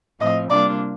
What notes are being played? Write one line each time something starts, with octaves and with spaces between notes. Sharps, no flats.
A2 F3 C4 D#5
C3 G3 A#3 D4 F4 D5